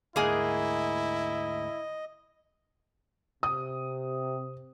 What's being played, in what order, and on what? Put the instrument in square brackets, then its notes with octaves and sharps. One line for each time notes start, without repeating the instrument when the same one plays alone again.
[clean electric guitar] D2 G#2 [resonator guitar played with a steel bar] A#3 G#4 [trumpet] E4 [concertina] D#5
[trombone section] C3 [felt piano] D#6